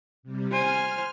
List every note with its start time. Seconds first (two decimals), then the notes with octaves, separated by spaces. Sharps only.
0.23 C3 G3
0.51 C5 G#5 F6